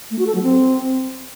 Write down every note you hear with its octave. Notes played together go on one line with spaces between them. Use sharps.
A3
F#4
A4
F#3
C4